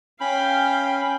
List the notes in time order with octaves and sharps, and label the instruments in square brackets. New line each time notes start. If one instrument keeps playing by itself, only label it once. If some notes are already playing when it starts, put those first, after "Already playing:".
[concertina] C#4 B5 [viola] F5 G5